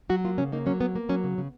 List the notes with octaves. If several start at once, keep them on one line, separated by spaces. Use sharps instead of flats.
F#3 F#4
A#3 F4
C#3 C#4
A#3 D#4
F#3 C#4
A#3 B3
A#3
F#3 C#4
C#3
C#3